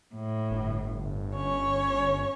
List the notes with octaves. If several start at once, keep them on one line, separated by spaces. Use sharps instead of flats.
A2
G1
C#4 C#5